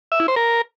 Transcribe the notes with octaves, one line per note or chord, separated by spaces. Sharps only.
E5
E4
C5
A#4